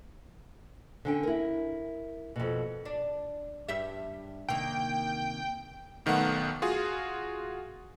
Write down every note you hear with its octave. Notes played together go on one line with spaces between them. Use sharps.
D3 C#4 G5
E4 A#4
F2 B2
D4
G2 G4 E5
C3 D#3 A#3 G5
B1 D#3 A3 B3 F#5
F4 F#4 G#4